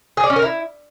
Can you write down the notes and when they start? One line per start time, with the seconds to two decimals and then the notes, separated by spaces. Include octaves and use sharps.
0.17 G#4
0.24 D5
0.30 C#4
0.36 A#4
0.42 E4